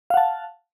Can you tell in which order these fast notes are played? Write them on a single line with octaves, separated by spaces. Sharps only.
F5 F#5 A5